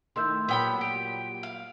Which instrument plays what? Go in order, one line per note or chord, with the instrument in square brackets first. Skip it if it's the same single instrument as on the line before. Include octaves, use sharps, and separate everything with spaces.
[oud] D#3 A3 E4 [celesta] C6 E6 G6
[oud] A#2 F#3 G3 [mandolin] B3 G5 B5
[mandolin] G4 [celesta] D7
[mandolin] F5